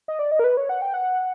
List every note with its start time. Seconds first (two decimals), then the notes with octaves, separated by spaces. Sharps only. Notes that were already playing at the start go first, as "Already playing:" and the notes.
0.08 D#5
0.19 D5
0.31 D#5
0.39 A#4
0.44 B4
0.57 C#5
0.69 F#5
0.82 G5
0.94 F#5